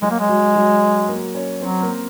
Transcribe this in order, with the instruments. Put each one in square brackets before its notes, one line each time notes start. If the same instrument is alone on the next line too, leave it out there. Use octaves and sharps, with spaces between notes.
[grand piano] F#3 F#4 [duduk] G#3
[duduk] A#3
G#3
[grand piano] F#3 F#4
F#3 F#4
A#3 A#4
C#4 C#5
[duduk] F#3 [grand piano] C4 C5
[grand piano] A#3 A#4